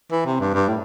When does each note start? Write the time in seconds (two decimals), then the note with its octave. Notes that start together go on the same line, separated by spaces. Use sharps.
0.12 E3
0.26 C3
0.40 G2
0.54 G2
0.69 A2